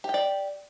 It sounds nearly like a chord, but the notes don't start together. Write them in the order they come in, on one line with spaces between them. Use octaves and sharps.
G4 G5 D5